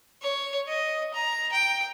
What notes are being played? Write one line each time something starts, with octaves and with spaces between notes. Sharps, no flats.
C#5
D#5
A#5
G5